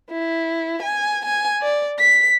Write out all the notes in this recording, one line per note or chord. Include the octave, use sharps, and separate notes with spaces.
E4
G#5
G#5
D5
B6